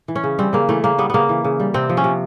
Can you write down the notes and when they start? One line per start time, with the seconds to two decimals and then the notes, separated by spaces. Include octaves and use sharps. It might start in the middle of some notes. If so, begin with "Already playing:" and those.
0.08 E3
0.15 C#4
0.24 C#3
0.39 G3 C4
0.53 C#3 A#3
0.69 E3 A3
0.84 C#3 A#3
0.98 G3 B3
1.10 C#3 A#3 B3
1.29 E3
1.44 C#3
1.60 G3
1.74 C3 C4
1.89 F3
1.97 C#4
2.04 C3